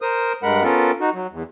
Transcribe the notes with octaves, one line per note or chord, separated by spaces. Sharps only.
A#4 C5 D#6
G2 G#3 A#4 F#5 B5
B3 C#4 F4 A4 A#4
D#4 F#4
F#3
E2